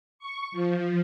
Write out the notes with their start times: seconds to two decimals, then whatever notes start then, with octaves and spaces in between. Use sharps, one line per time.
0.19 C#6
0.52 F3